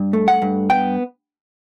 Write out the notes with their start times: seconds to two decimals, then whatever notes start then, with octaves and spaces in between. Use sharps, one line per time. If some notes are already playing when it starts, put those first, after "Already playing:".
Already playing: G2
0.13 A3
0.28 F#5
0.42 G2
0.70 B3 G5